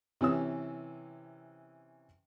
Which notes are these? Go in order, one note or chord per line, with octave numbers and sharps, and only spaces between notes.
C3 E3 C#4 E6